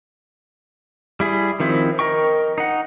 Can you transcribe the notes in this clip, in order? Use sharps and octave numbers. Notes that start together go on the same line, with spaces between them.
G3 E4 G#4
D#3 F3 C4 E4
A#4 D#5 G5 C#6
D#4 F#5